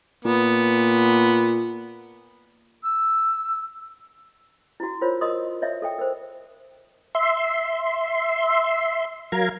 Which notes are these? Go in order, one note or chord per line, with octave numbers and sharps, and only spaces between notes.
A#2 B3
E6
E4 F#4
F4 A#4 C5 C#5
A#4 D#5 C6 D#6
C#5 D#5 E5
A4 E5 G5
A#4 C5
E5 C6
F#3 A#4 F5 A#5 G#6